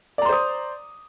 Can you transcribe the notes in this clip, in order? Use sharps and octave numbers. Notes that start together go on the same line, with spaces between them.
C5 D5 A#5 C6 D#6